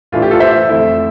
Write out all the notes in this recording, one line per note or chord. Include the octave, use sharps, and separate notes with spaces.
A2 E3 A3 D4 F4
G4
F4 A4
C5 E5
F2 D3 A3 E4